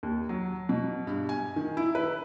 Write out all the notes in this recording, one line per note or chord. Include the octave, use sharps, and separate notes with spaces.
D#2
F#3
B2
G2
G#5
D#3
E4
B4